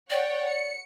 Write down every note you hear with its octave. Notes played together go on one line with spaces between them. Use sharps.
C#5 D5 F#5 G5
C#7